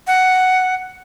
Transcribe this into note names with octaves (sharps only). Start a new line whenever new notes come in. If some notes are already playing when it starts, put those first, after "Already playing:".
F#5